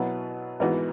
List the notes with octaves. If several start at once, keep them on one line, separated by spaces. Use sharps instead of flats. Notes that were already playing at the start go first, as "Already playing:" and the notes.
Already playing: B2 F#3 B3 E4 B4
G#1 G#2 E3 B3 F#4